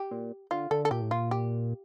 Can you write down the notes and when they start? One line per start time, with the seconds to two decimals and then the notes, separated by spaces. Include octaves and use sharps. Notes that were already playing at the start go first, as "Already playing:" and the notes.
Already playing: G4
0.11 A#2
0.51 D3 F4
0.71 D3 A4
0.85 A4
0.91 A#2 G4
1.01 A2
1.11 A#2 F4
1.31 G4